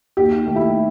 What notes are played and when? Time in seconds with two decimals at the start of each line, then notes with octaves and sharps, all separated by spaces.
0.17 D#2 G4
0.46 D#3 A3
0.56 E4